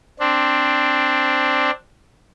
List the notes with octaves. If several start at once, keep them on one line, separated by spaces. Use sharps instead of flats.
C4 D4